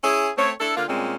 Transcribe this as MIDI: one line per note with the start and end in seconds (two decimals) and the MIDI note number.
0.03 0.29 61
0.03 0.29 64
0.03 0.29 68
0.37 0.51 57
0.37 0.51 60
0.37 0.51 73
0.59 0.73 62
0.59 0.73 64
0.59 0.73 69
0.76 0.85 50
0.76 0.85 58
0.76 0.85 65
0.87 1.15 46
0.87 1.15 55
0.87 1.15 56
0.87 1.15 60
0.87 1.15 61